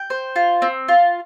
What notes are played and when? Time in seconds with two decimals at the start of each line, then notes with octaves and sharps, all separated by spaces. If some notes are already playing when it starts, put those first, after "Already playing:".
Already playing: G5
0.10 C5
0.36 F4
0.62 C4
0.88 F4